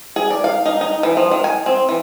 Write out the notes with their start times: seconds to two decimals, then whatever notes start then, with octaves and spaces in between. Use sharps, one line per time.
0.16 G#4
0.30 D5
0.44 F5
0.66 D#4
0.81 D#4
1.03 E3
1.17 F3
1.31 D#3
1.44 G#5
1.66 C4
1.89 E3